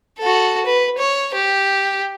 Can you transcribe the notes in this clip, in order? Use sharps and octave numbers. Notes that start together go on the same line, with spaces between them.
F#4 A4
B4
C#5
G4